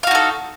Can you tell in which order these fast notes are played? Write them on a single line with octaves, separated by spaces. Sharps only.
F5 F#4 D#4 A4